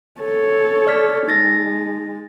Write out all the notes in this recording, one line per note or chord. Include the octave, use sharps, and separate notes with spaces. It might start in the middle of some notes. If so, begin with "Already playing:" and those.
A4 C#5
D5 F6 B6
G#3 D#4 A6 A#6